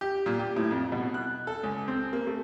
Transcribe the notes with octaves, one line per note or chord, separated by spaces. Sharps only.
G4
A#2
G4
A2
F2
B2
F#6
A4
C#2
C4
A#3
A3